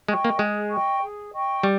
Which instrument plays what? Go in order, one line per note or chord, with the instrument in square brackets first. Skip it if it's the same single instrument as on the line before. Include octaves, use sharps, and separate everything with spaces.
[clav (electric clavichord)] G#3 [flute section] D#5 G5 C#6
[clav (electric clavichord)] A#3
[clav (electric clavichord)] G#3 [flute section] G#4
[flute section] D#5 G5 C#6
G#4
D#5 G5 C#6
[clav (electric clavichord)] G3